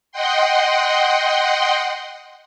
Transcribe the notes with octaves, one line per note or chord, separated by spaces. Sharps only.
D#5 F#5 G5 C6